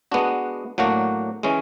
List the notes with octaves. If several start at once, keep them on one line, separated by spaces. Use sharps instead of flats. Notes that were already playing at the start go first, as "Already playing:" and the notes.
G#3 B3 D4 F#4
A2 F#3 A#3 D4 F#4
E3 G#3 C#4